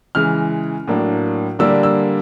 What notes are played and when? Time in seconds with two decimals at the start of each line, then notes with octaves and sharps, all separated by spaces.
0.15 C#3 E3 G#3 F6
0.88 A2 F#3 A#3 D4
1.59 D3 G3 A#3 D4 E6
1.83 E6